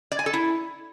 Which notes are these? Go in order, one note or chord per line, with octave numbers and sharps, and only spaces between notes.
D5
G#5
A4
E4